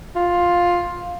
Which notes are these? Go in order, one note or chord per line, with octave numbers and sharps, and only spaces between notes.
F4